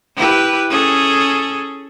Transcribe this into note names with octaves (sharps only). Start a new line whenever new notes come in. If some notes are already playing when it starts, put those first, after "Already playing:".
E4 G4 B4
C#4 G#4 A4